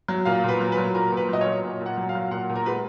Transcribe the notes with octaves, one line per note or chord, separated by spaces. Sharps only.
F#3
A#2 F5
A#2 B4
F#3
B4
F#3
A#2 A#4
A#2 B4
F#3 D#5
C#5
F#3
A#2
A#2
F#5
F#3
F5
F#3
A#2 F#5
A#2
A#4
G#3 B4